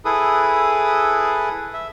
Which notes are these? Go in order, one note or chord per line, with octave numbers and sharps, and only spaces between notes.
E4 G#4 A4 B4 D#6
E5